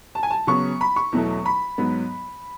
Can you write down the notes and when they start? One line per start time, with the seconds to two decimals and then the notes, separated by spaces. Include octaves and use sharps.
0.15 A5
0.23 G#5
0.31 A5
0.47 C#3 F#3 B3 C#6
0.81 B5
0.96 C#6
1.12 E2 B2 F#3 A3
1.46 B5
1.78 G#2 F#3 B3